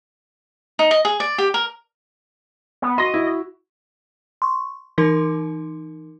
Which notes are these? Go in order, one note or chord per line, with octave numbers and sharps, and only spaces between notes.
D#4
D#5
G#4
D5
G4
A#4
B3
F#4 D#5 C6 A#6
E4
C6 C#6
E3 D#4 A#4 C6